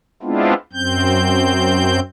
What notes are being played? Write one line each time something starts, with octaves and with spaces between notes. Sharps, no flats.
G#3 B3 C4 D4 E4 F4
F#2 C4 G6